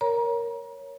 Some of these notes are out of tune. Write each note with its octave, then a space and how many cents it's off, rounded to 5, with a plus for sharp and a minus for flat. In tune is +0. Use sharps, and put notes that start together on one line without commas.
A#4 +5 C#5 +0 A#5 +30